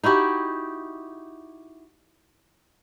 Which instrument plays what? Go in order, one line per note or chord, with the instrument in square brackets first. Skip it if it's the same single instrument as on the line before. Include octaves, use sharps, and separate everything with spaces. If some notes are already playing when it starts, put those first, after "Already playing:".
[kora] D#4 E4 F#4 G4